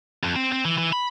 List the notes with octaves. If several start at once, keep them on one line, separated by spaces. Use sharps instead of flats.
F2
C4
C4
E3
E3
B5